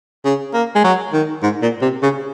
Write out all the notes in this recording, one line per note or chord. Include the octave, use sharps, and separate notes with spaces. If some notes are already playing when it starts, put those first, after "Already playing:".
C#3
A#3
G#3
F#3
D#3
G#2
A#2
C3
C#3